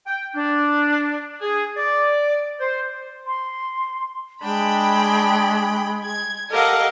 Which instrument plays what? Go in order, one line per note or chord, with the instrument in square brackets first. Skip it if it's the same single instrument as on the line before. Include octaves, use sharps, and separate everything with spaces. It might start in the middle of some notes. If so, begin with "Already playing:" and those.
[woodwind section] G5
D4
G#4
D5
C5
[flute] C6
[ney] G#3 [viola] D4 [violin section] G5 B5
[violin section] G#6
[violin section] G4 D#5 F#5 [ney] A4 [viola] A#4 F5